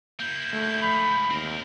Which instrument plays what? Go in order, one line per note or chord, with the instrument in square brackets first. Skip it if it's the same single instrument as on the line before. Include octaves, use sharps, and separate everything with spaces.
[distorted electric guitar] A#3 E4 [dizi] G6
[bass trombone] A3
[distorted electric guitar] G#2 F3 [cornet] B5
[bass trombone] D#2 [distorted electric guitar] C4 A#4